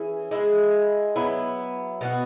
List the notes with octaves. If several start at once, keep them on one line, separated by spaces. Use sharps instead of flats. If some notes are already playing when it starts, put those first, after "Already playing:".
Already playing: E3 C#4 E4 G#4
G#3 E4 G#4
F#3 B3 E4
B2 B3 F#4